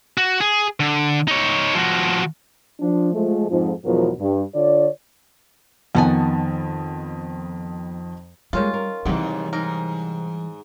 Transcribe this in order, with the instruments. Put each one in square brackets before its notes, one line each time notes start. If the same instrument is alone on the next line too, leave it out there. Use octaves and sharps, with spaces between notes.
[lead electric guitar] F#4
G#4
D3
D#4 C#5
F3 F#4
[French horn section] F3 D4
F3 G#3 A3
F2 G#2 F3
E2 G#2 B2 F3 F#3 A#4
G2
D3 F4 C#5 D5
[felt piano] F2 D#3 A5 [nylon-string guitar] B3 F#5 G#5
[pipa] D#3 C#4 F4 [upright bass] G3 [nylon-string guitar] G#3 A#3 A4
[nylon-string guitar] A#4
[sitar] D#2 G#2 [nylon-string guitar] C3 D5 F#5 [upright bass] E3 G3
[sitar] G#2 [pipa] A#4